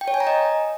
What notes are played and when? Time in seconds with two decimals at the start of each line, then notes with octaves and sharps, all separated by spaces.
0.01 G5
0.08 C#5
0.14 G#5
0.20 A#5
0.27 D#5